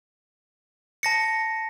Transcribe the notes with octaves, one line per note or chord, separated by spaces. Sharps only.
A5 A#6 C#7